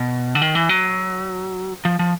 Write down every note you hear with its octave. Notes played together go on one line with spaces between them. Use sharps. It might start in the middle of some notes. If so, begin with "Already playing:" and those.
Already playing: B2
D3
D#3
E3
F#3
F3
F3